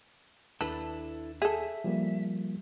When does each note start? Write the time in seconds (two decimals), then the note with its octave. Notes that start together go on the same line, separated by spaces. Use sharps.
0.61 D#2 D4 E4 A4 B4
1.42 G#4 A4 E5
1.84 F3 G3 A#3